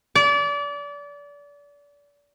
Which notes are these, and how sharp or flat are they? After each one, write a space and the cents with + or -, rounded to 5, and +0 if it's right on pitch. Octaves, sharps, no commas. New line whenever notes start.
D5 -30